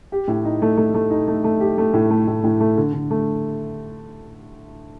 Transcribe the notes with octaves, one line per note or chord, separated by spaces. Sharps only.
G4
A2
D#4
A3
A3
A3
D#4
A3
A3
G4
A3
A2
A3
A2
A2
A3
D3
D3
A3